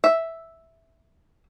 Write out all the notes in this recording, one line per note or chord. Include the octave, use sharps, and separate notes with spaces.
E5